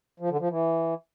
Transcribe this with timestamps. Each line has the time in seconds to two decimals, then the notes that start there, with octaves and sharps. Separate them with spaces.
0.20 F3
0.30 D3
0.40 F3
0.50 E3